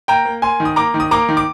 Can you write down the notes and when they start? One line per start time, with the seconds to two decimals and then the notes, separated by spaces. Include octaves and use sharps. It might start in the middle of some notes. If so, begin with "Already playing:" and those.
0.08 A#3 G5 A#5
0.25 A#3
0.42 A#3 G#5 C6
0.60 D#3
0.65 D#6
0.76 A#3 A#5 D6
0.94 D#3
1.00 D#6
1.11 A#3 A#5 D6
1.29 D#3
1.37 D6